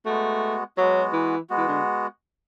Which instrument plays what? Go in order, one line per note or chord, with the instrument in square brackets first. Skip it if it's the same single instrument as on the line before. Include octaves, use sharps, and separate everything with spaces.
[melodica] G#3 B3 F#4 [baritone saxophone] A3
[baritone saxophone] F#3 [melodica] G#3 B3 F#4
[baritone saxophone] E3
[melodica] G#3 B3 F#4
[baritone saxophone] E3
D3